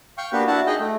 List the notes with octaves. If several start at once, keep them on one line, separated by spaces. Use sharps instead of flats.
F5 G5 C#6
A#3 B3 D4 F#4 G4 B4
D4 E4 F#4 F#5 A5
D#4 G#4 D#5 G5
A3